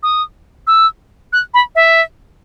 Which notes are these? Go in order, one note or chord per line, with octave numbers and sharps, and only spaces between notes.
D#6
E6
F#6
B5
E5